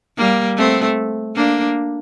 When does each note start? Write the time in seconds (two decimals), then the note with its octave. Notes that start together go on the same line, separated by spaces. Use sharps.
0.17 G3 A#3
0.57 A3 C4
1.35 A#3 D4